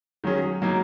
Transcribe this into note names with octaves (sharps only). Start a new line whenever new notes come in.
D#3 F#3 C#4 G#4
F#3 A#3 D#4 A#4